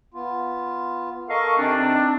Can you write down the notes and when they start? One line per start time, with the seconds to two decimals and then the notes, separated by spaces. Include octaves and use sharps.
0.14 B3 F4
1.29 A4 A#4 D#5 F5 C#6
1.58 C3 C4 D4 D#4 G#5
1.77 D#4